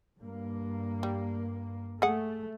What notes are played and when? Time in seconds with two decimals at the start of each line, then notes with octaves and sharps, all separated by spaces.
0.19 G2 A#3
1.03 G3
2.02 A3 G#4 F#5